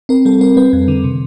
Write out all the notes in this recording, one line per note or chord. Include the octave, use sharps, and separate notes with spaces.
C4 A#4
G3 A4
C4 A#4
G3 B4
F2
D3
C3